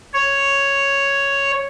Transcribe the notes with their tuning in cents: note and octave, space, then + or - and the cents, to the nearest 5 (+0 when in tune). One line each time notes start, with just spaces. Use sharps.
C#5 +0